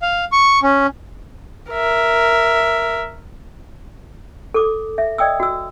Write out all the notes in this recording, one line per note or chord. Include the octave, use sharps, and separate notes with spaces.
F5
C#6
C#4
A#4 E5
A4 D6
E5
D5 D#5 G5 D#6 E6
F#4 E6